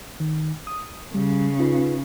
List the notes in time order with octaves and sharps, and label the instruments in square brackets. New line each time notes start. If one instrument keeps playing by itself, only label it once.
[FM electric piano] D#3
D#6
[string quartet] C#3 [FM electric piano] G3
[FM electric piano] D#4 F4 B4